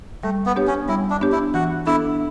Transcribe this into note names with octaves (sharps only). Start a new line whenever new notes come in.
G3 A3
B3
B3 D4 G4 C#5
C#4
G3 E4
D4
B3 D4 G4 C#5
E4
E3 F#4
B3 D4 E4 A4